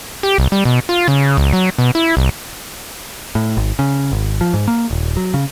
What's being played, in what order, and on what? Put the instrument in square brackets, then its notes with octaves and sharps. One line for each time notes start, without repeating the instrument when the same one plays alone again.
[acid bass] G4
C2
G3
B2
F4
C#3
C#2
F#3
B2
E4
C2
[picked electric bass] A2
G#1
C#3
G#1
F3
G#2
A#3
D#1
F#3
C#3